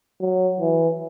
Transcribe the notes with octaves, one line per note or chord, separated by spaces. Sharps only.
F#3
E3